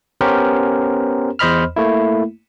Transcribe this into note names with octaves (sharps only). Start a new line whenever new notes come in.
B3 C#4 G4 A#4 C5
E2 C5 D#5 B5 F6
A3 A#3 E4